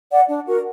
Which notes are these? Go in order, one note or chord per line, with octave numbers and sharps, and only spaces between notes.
D5 F#5
D4
F#4 A#4